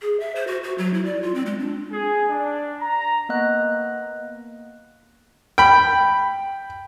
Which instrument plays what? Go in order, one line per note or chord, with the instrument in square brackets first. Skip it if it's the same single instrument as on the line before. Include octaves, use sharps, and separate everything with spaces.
[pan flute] G#4
E5
C5
F#4
F#4
F#3
E4
D5
F4
C4
G#3
D4
[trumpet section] G#4
D4
A#5
[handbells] A#3 B3 D#5 F#6
[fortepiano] G5 B5